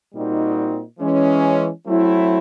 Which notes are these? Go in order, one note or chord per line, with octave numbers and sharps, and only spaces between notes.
A#2 G3 C4 D#4 F#4
E3 G#3 C#4
F#3 A3 C4 E4